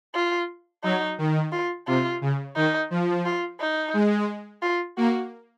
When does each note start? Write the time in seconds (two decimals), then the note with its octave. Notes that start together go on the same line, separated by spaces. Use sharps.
0.15 F4
0.84 F#3 D#4
1.18 D#3
1.52 F4
1.87 C3 F4
2.21 C#3
2.56 D#3 D#4
2.90 F3
3.26 F4
3.60 D#4
3.94 G#3
4.62 F4
4.97 A#3 F#4